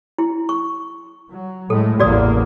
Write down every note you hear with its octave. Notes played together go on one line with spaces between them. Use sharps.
E4
C#6
F#3
A2 G#3 A3 A4
A1 E2 A#3 F#4 D5 D#6